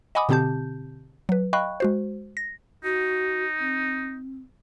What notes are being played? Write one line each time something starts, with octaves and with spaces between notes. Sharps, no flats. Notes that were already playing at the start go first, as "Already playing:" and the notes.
D#5 F#5 G#5 B5 D6 D#6
B2 D3 C4 G4 A5 G6
F#3 B4
D#5 F5 G5 B5 C#6 F#6
G#3 F#4 C5
A#6
D#4 F#4
C4